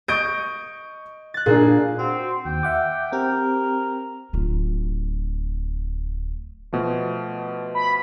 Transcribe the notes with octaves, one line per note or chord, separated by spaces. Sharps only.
D#5 C#6 G6 D7
F#6 A6
A#2 A#3 D4 G#4
C4 F#4
D#2 G5
E5 F#5 D6
C4 G4 A#4
D1 F4
B2 F3 A3
B5